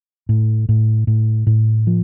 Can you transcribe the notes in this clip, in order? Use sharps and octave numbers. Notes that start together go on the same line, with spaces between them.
A2
A2
A2
A2
F3